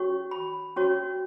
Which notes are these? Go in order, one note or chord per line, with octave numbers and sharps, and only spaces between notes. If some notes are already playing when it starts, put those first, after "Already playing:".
Already playing: C#4 F#4 C#5 C#6
B5
C#4 F#4 C#5